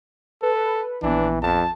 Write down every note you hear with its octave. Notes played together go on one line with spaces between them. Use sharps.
A4 B4
A#1 E3 B3 D4
F2 A5